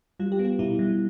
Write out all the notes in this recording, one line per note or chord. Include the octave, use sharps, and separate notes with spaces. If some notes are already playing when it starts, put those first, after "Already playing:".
G3 F4
G4
B3
F4
B2 E4
G3